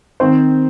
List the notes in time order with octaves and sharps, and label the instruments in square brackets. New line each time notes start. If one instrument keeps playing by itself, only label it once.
[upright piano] D#3 C4 C5